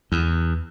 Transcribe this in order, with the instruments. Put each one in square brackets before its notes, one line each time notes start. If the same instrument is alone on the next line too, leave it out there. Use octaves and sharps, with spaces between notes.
[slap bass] E2